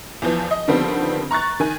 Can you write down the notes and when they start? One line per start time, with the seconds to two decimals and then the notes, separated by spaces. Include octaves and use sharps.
0.22 E2 E3 F3
0.51 D#5
0.68 D3 D#3 F3 G3 B3 C4
1.31 A#5 C#6 F#6 A6
1.60 D#3 G#5